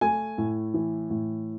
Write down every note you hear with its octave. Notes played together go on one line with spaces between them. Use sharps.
A3 G#5
A2
E3
A2